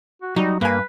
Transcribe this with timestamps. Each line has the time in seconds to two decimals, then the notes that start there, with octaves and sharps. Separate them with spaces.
0.22 F#4
0.36 F#3 G3 D#4
0.61 G2 A#3 B4 G#5